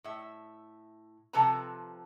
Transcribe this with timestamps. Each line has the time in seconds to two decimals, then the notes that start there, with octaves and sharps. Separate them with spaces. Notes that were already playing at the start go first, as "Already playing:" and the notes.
0.04 A2 E5
1.33 C3 F3 A4 B4 A5 A#5